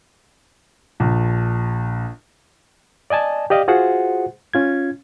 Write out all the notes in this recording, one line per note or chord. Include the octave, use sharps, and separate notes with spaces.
A#1
D5 D#5 G#5 A5
G4 D5 D#5 F5
F4 F#4 G#4 C5 F#5
C#4 F4 G#6